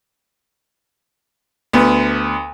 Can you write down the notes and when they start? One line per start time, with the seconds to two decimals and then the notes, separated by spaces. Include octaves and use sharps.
1.73 D2 B3